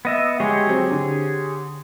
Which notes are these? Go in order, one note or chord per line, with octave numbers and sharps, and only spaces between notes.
B3 D#5 E5
G#3 G4 G#4 C#5
F#3 C4
D3